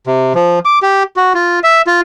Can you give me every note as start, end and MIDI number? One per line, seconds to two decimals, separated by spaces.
0.07 0.33 48
0.35 0.59 53
0.65 0.79 86
0.82 1.03 67
1.16 1.33 66
1.35 1.59 65
1.64 1.82 76
1.87 2.01 65